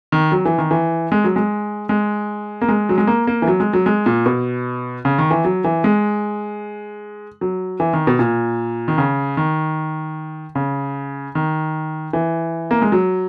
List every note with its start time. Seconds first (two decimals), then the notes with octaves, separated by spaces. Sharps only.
0.12 D#3
0.32 F#3
0.45 E3
0.58 D#3
0.71 E3
1.12 G#3
1.24 F#3
1.36 G#3
1.89 G#3
2.62 A#3
2.68 G#3
2.89 F#3
2.98 G#3
3.07 A#3
3.27 A#3
3.42 E3
3.48 F#3
3.60 G#3
3.73 F#3
3.86 G#3
4.06 A#2
4.26 B2
5.05 C#3
5.18 D#3
5.31 E3
5.45 F#3
5.64 E3
5.84 G#3
7.41 F#3
7.80 E3
7.93 D#3
8.07 B2
8.19 A#2
8.88 D#3
8.98 C#3
9.37 D#3
10.55 C#3
11.35 D#3
12.13 E3
12.71 A#3
12.82 G#3
12.92 F#3